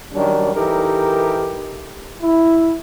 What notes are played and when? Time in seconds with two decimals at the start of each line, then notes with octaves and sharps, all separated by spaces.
0.13 D#3 F#3 G3 C#4 D4
0.55 E3 D#4 G4 A4 A#4
2.22 E4